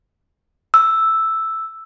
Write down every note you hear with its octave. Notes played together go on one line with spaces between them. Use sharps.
E6